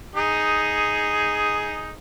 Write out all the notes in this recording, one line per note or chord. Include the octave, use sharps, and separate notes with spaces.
D#4 G#4